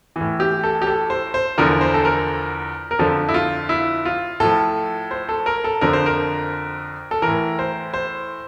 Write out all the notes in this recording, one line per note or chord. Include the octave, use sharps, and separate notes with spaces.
A2 E3
G4
A4
G4
A4
C5
C5
E2 D3 F3 A#4
C5
A4
A#4
A#4
F2 D3 F3 A4
E4
F4
E4
F4
A2 F3 A4
C5
A4
A#4
A4
F2 D3 F3 A#4
C5
A#4
A4
E3 A#4
A2
C5
C5